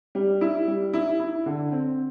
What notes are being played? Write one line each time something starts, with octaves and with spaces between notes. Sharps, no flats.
G3
E4
G3
E4
E4
D3
C4